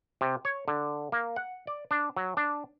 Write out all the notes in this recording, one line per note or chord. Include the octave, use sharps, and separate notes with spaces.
C3
C#5
D3
A#3
F#5
D5
D4
F#3
D4